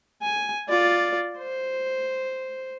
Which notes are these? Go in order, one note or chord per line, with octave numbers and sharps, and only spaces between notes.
G#5
F4 D5
C5